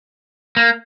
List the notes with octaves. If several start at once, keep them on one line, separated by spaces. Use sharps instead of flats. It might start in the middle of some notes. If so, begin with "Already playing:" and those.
A#3